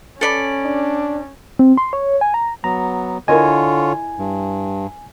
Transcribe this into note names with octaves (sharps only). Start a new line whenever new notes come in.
C#4 A4 D5 B5
D4
C4
C6
C#5
G#5
A#5
F#3 B3 A#5
D3 E4 F4 A#4 C#5 D#5 G#5
G2